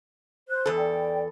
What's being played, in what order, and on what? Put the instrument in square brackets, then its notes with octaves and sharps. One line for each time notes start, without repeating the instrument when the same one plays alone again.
[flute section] C5 F#6
[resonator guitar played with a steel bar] E2 A4
[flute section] D5 G5